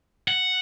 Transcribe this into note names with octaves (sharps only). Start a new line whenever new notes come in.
F#5